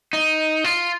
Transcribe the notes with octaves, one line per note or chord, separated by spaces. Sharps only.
D#4
F4